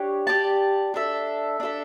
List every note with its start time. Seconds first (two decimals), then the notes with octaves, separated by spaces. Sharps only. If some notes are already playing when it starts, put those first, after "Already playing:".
Already playing: D4 G4 C#5
0.27 G4 D5 A5
0.94 D4 A4 E5
1.60 D4 A4 E5